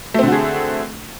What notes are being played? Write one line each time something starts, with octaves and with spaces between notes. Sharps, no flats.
D3 A3 C4 F#4 G#4